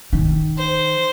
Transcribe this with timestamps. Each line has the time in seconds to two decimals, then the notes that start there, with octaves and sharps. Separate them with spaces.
0.13 D#3
0.58 C5